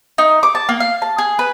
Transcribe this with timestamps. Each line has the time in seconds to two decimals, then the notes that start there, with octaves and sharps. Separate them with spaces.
0.18 D#4
0.43 D6
0.55 A5
0.69 A#3
0.80 F5
1.02 A5
1.18 G#4
1.39 B4